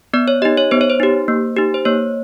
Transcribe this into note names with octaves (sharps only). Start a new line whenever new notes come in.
B3 D5
C#5
D#4 G4 D#5
C#5
B3 C5
C#5
C5
D#4 G4
A#3
D#4 G4
C5
A#3 C#5